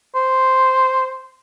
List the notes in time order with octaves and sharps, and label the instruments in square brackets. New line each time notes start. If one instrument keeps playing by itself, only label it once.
[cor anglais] C5